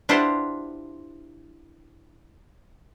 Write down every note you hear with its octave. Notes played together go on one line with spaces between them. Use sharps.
D4 E4 F4 G4 C5 F#5